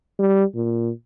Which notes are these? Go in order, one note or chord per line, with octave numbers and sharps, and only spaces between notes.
G3
A#2